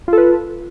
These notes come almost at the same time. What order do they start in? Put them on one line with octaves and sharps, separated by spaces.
F4 A4 B4